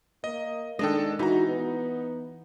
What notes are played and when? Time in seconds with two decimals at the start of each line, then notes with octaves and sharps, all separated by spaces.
0.24 A#3 D#5
0.79 D#3 G#3 D4 A4 D#5 G5
1.19 E3 D#4 F#4 A#5
1.48 B3